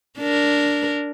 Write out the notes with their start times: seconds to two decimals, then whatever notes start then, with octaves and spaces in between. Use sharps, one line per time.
0.19 D4 A#4